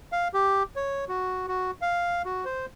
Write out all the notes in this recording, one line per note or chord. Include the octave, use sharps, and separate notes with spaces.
F5
G4
C#5
F#4
F#4
F5
F#4
C5